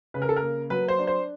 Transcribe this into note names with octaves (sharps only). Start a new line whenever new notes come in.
C#3 B4
A#4
A4
A#4
A#3
F#3 B4
C5
D4
C5